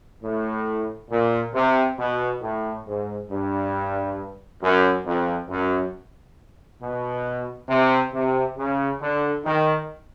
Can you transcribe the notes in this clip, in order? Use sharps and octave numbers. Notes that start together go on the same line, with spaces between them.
A2
A#2
C3
B2
A2
G#2
G2
F#2
F2
F#2
B2
C3
C3
C#3
D3
D#3